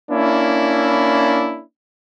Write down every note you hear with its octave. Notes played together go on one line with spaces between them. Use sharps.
A#3 C#4 D4 E4